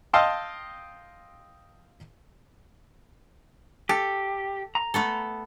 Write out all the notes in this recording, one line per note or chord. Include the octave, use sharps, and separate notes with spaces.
D#5 F5 G5 A5 C6 E6
G4 A4
A#5
A3 B3 A4